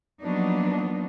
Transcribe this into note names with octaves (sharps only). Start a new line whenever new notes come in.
F3 F#3 A#3 B3 D4 D#4